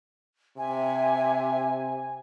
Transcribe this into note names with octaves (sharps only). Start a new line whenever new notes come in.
C3 E5 G#5